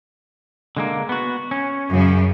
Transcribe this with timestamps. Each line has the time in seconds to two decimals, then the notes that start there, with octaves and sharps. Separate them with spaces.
0.77 D3 G#3 A#3
1.09 B3 F#4
1.51 C#4
1.88 F#2 C#3